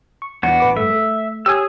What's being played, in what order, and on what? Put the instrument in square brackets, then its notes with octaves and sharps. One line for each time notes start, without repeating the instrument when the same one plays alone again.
[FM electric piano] C#6
[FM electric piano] E2 E3 [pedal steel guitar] B3 D4 F#4
[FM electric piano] A1 B4 D6
[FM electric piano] G2 A3 [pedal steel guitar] E5
[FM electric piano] A3
[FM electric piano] G4 C#5 G#5 [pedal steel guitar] G#4 D#6 E6